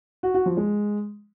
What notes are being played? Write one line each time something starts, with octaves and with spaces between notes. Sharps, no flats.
F#4
F#4
F3
G#3